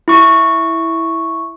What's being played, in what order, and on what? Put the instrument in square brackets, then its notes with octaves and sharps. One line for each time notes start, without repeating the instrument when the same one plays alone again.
[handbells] E4 C#6